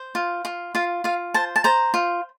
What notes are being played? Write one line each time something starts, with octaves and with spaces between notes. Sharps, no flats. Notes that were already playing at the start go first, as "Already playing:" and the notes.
Already playing: C5
F4
F4
F4 F5
F4 F5
C5 A5
A5
C5 A#5
F4